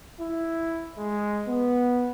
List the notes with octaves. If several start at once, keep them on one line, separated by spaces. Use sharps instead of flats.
E4
G#3
B3